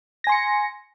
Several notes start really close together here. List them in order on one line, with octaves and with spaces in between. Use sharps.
A#6 G#5 C6 C#7